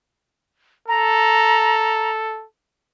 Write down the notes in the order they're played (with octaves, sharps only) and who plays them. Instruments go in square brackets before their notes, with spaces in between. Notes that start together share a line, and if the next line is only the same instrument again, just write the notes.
[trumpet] A4 [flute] A#5